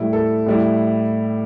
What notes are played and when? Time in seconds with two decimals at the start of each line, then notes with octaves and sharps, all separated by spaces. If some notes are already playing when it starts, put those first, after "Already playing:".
Already playing: A2 G3 E4
0.13 A4
0.46 A2 G3 E4